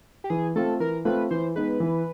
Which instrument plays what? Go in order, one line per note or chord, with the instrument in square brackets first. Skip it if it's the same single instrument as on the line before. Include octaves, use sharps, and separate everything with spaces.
[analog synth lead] G4
[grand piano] E3 [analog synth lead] G#4
[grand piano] A3 C4 F4 [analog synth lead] A4
[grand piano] E3 [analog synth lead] A#4
[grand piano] A3 C4 F4 [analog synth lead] B4
[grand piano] E3 [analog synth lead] C5
[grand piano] G#3 B3 D#4 [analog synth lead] B4
[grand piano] E3